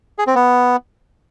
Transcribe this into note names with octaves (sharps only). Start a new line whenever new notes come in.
G#4
C4
B3